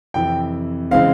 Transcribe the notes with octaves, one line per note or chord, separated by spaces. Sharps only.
F2 C3 E3 G5
C#3 E3 G#3 C4 F5